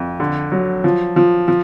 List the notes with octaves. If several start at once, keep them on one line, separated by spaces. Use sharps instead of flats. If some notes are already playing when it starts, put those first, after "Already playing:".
Already playing: F2
D3
F#3
F3
F3
F3